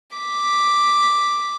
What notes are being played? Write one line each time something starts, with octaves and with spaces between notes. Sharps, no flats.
D6 B6